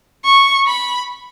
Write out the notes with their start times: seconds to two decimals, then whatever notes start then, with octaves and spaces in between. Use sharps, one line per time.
0.25 C#6
0.67 B5